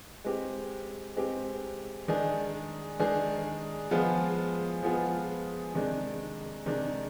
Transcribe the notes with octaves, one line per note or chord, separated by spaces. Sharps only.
G#3 C4 G4
G#3 C4 G4
D#3 G#3 D4 G#4
D#3 G#3 D4 G#4
F3 G#3 B3 F4 G#4
F3 G#3 B3 F4 G#4
C3 D#3 G#3 D4
C3 D#3 G#3 D4